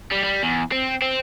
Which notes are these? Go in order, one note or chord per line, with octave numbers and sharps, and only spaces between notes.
G3
G3
E2
C4
C4